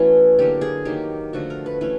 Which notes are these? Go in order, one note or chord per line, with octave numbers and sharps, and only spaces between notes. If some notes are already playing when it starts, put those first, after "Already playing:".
Already playing: E3 A3 B3 C#4 F#4
D3 F#3 A#3 G4
G#4
D#3 F#3 A#3 G4
D3 F3 A3 F#4
A#4
B4
E3 A3 C#4 B4